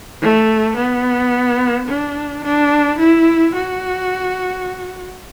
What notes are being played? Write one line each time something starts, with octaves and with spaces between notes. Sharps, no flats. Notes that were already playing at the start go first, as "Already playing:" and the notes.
A3
B3
D4
D4
E4
F#4